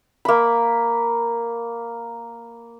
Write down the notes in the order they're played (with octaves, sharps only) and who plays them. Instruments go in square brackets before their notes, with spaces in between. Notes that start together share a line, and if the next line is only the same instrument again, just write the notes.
[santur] A#3 B5